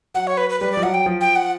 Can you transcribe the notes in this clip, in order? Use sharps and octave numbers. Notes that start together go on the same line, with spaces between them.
F#3 F#5
C#5
B4
B4
G3 B4
D5
F3
F#3 F#5
G5
F3
G5
F#5